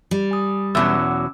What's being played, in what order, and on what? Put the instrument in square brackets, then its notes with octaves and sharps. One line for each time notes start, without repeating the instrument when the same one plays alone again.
[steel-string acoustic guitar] G3
[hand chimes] G#5 D#6
[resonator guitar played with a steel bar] E2 B2 F#3 [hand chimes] C#4 D6 E6